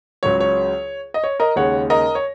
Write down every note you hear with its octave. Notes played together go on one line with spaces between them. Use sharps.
C#2 C#3 F#3 C#5
C#5
D#5
C#5
A#4 D#5
D#2 C#3 G#3 C#5 F#5
A#4 D#5
C#5